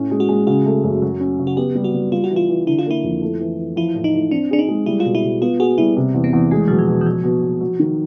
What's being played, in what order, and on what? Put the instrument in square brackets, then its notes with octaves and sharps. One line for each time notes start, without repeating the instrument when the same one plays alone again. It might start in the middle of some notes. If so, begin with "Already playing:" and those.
Already playing: [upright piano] A2 C#4
G#3
[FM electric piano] F#4
[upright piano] G#3
[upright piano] C#3 [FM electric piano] F#4
[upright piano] A3
F#2
F#3
C#4
C#3
[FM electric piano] F#4
[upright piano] B3 [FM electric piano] G4
[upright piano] G3
[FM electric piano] F#4
[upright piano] G3
[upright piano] G3 [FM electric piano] F4
[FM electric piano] F#4
[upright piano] E3
[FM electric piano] F4
[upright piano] E3
[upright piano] D3 [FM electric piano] E4
[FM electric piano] F4
[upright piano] A#3 [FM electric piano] E4
[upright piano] F2
A3
E3
E3
[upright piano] F3 [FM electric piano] E4
[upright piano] A2
[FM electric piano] D#4
[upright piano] A2
[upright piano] C4 [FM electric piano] D4
[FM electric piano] D4 [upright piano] G#4
[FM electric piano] D#4
[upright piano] G#3
[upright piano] G3 [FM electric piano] E4
[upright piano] B2 [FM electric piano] F4
[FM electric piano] E4
[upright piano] B2
[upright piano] B3 [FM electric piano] F4
[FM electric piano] F#4 [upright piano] G#4
[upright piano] G3 [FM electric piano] E4
[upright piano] C3
E2
[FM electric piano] B3
[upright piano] E2
[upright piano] G#3 [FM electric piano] A3
[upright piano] B2 [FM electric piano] F#3
[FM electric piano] F3
[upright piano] B2
[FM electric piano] E3
[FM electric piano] F3 [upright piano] F#3
[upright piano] B2
B2
F#3
D#3